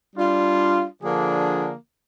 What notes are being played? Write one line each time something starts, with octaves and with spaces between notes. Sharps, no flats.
G3 D4 F4
D3 F3 A#3 D4 G#4